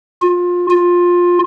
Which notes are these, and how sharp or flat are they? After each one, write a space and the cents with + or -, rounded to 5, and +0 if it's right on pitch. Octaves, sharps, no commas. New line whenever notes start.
F4 +25
F4 +15